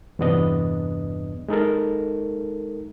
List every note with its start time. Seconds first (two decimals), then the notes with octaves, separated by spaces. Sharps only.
0.19 E2 G2 C3 B3 D4 D#5
1.48 G#3 D#4 A4 A#4